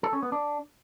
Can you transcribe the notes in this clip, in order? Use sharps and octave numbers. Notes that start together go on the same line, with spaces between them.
A4
C#4
B3
D4